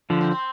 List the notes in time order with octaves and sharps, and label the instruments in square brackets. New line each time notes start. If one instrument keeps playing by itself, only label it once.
[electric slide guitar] D3 F3 [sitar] B3
[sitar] C4
C4